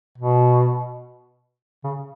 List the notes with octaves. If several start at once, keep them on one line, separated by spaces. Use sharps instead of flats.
B2
C#3